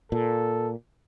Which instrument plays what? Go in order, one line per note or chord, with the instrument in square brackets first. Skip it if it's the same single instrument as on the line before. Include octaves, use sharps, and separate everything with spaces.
[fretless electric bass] A#2 [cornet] A4